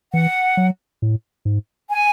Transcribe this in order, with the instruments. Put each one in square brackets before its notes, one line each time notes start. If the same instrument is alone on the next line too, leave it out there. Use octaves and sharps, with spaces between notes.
[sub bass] E3 [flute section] F#5
[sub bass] F#3
A2
G#2
[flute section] G#5